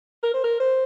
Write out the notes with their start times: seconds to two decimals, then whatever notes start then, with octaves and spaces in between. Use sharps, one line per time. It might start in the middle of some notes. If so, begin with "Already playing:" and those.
0.23 A#4
0.34 C5
0.44 A#4
0.60 C5